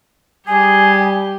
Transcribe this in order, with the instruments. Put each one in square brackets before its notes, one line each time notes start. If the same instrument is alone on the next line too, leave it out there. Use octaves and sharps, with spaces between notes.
[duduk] G3 [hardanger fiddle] G4 [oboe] G#4 [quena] G#5